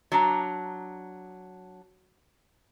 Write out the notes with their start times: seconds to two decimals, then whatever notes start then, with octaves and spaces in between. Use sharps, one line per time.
0.12 F#3 D4 A#5